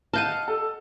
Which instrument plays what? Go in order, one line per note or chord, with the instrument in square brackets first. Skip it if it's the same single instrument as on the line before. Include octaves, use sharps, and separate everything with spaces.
[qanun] D#5 F5 F#5 [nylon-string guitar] A5 [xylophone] F6 G6 D#7
[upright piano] A4